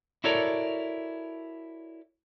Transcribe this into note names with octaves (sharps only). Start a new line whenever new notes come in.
E4 F#4 A4 A#4 C#5 D5